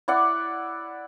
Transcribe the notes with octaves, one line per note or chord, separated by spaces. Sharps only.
E4 D5 F#5